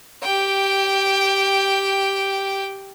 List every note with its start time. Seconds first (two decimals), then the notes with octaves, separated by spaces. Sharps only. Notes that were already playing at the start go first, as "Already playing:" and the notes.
0.23 G4 G5